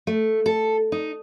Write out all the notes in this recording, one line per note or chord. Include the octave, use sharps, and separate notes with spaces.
A3
A4
D#4